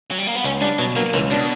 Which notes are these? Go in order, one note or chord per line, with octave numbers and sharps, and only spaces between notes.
F#3
G3
A#3
B3
C#2 C#4
G3 D4
B2 F#3
F#3 A#3
C#2 E3
B2 D4